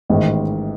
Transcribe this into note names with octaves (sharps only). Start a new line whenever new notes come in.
A1 G#2 D#3